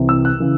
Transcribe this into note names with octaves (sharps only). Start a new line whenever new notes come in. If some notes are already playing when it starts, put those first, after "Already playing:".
Already playing: C2 C3 E3
E6
F#6
C#3 E3